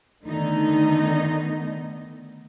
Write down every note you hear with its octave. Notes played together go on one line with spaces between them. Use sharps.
D3 D#3 A3 B3 D#4